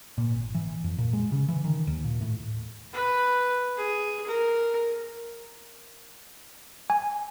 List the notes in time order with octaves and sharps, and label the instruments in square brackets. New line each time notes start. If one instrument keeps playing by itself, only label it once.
[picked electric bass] A#2
G#1
E3
F2
A#2
G#3
C#3
E3
D#3
D#2
A#2
A2
[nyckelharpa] B4
G#4
A#4
[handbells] G#5